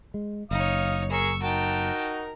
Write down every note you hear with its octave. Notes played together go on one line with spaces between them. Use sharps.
G#3
F#1 D#4 C#5 F5 D#6
G#4 A#4 C#6 E6
D#4 F#4 A#4 G5 A5